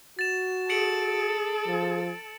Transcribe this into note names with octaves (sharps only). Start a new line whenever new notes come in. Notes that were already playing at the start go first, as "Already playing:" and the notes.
F#4 A6 E7
G#4 A4 C#7 D7 F#7
F3